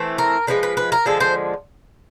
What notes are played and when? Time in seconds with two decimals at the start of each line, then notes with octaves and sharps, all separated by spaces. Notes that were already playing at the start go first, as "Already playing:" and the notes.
Already playing: E3 A3 C4
0.18 A#4
0.47 D3 F3 G#3 B4
0.63 B4
0.77 B4
0.92 A#4
1.06 D3 F3 G#3 A4
1.20 C5